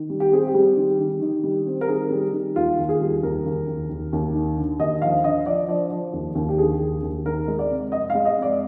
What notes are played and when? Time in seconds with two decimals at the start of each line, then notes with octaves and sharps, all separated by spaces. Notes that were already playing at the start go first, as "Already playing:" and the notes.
Already playing: D#3
0.10 G3
0.20 G4
0.32 C4 G#4
0.47 G4
0.54 G3
0.77 D#3
0.99 D#3
1.22 D#3
1.44 G3
1.66 C4
1.81 A#4
1.88 D#3 G#4
2.11 G3
2.33 D#3
2.56 D#2 F4
2.78 D#2
2.89 G#4
3.01 G3
3.23 D#2 A#4
3.45 D#2
3.67 D#2
3.89 D#2
4.13 D#2
4.34 D#3
4.57 D3
4.79 D#2 D#5
5.02 F3 F5
5.24 D3 D#5
5.46 F3 D5
5.68 F3 D5
5.91 F3
6.13 D#2
6.35 D#2
6.49 G4
6.58 D3 G#4
6.80 D#2
7.02 D#2
7.25 D#3 A#4
7.48 G#3
7.59 D5
7.70 C3
7.92 F2 D#5
8.10 G#3 F5
8.25 D#5
8.38 F2 D5